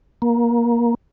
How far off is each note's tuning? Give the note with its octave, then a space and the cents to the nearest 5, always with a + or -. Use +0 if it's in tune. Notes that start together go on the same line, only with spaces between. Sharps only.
A#3 +20